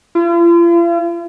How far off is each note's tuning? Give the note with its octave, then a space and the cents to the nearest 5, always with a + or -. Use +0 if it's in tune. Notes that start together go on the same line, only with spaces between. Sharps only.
F4 -45